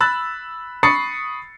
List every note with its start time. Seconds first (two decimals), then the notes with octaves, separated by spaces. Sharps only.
0.01 B5 E6 F#6 A6
0.83 B5 C#6 D#6 A6 C7 C#7